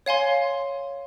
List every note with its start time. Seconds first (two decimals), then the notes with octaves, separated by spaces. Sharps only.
0.06 C#5 F5 G#5 C6